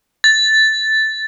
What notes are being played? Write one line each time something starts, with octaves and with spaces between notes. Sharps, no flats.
A6